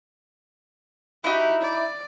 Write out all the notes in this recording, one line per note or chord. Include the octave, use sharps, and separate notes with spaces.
D#4 E4 F#4 G4
D5